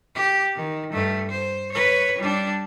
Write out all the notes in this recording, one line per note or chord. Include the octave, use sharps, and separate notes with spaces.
G4
D#3
G2 A3
C5
B4 C#5
G3 D4